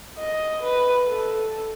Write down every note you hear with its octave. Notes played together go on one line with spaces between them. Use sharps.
D#5
B4
A4